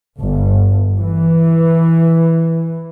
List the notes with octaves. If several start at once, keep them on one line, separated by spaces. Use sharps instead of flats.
G1
E3